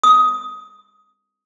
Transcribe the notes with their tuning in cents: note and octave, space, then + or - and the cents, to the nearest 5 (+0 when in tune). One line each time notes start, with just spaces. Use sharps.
D#6 +15